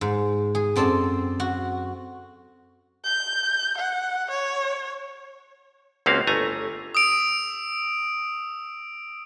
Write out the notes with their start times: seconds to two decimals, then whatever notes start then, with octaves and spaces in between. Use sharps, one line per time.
0.01 G#2
0.55 G#4
0.76 F#2 C4 A4 D5 A5
1.40 F#4
3.05 G6
3.78 F#5
4.31 C#5
6.06 C#2 A#3 C4 C#4 F#4 F5
6.27 G1 A3 G#5 A#5
6.95 D#6 E6 D7 F7